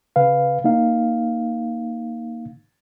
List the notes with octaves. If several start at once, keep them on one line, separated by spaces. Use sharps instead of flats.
C#3 B4 F5
A#3 D#4 F5